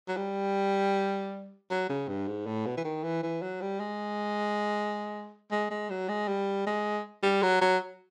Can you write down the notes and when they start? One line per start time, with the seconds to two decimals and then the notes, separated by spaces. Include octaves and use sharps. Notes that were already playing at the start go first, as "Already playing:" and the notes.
0.08 F#3
0.17 G3
1.70 F#3
1.89 C#3
2.08 G2
2.27 G#2
2.46 A2
2.66 B2
2.77 E3
2.84 D#3
3.03 E3
3.23 E3
3.42 F#3
3.61 G3
3.80 G#3
5.51 G#3
5.70 G#3
5.90 F#3
6.09 G#3
6.28 G3
6.66 G#3
7.23 G3
7.42 F#3
7.61 F#3